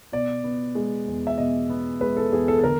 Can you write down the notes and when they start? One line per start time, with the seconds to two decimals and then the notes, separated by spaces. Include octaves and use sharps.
0.12 B2 D5
0.44 B3
0.75 G#3
1.07 E2
1.27 E5
1.38 B2 D#5
1.69 B3
2.01 G#3 B4
2.17 A4
2.32 E2 G#4
2.48 A4
2.59 A4
2.64 D3 A#4